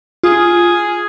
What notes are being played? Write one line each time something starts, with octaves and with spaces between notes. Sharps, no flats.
F4 G#4